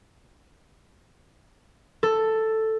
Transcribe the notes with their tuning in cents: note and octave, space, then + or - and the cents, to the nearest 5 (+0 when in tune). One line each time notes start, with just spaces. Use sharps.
A4 +5